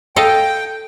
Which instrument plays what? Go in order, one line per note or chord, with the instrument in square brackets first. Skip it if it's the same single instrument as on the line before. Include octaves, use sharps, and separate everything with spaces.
[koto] A4 D#5 F5 [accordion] G5